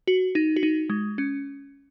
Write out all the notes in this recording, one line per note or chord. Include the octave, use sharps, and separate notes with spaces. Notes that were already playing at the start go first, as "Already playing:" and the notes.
F#4
D#4
F#4
D#4
G#3
C#4